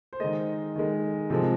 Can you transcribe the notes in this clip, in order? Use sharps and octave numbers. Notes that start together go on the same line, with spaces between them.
C5
D#3 G#3 D#5
D#3 G#3
C3 F3 G#3